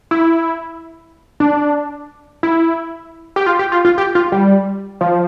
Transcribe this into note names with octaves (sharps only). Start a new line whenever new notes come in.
E4
D4
E4
G4
F4
G4
F4
F4
G4
F4
G3
F3